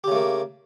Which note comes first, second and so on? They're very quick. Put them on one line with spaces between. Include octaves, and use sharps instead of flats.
G4 C#3 A3 A#3